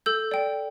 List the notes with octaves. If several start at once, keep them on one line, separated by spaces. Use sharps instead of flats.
A4 E6 G6
D5 G5